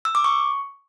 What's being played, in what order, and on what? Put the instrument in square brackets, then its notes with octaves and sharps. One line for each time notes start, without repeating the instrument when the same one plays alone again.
[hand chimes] E6
D6
C#6